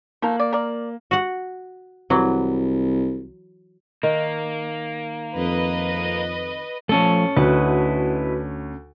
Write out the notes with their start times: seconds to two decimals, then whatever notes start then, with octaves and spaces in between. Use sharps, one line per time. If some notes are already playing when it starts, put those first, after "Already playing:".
0.22 F3 A3 A#3 A#5
0.40 D5
0.53 A#4 D5
1.11 F#4 F#5
2.10 C2 E3 F#3
4.03 D#3 A#3
5.35 F2 B4 D#5
6.89 F3 A3 C#4 A4
7.37 D2 E4 F#4 B4 D#5 F#5